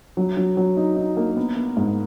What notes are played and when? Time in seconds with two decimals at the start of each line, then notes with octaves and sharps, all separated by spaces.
0.17 F#3
0.37 F#3
0.57 F#3
0.77 D#4
0.96 D#4
1.17 A#3
1.37 B3
1.57 B3
1.77 G#2